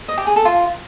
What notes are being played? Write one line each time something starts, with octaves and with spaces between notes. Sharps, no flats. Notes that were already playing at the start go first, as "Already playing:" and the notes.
D#5
G4
G#4
A4
F4